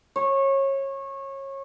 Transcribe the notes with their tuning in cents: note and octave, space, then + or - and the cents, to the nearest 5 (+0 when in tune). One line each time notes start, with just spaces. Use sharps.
C#5 -25